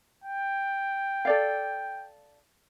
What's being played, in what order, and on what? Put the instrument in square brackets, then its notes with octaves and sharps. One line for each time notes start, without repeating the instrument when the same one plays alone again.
[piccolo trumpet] G5
[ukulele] A4 D5 F5